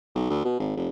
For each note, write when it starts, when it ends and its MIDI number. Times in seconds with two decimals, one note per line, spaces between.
0.15 0.27 35
0.30 0.43 38
0.45 0.57 47
0.60 0.72 32
0.77 0.89 29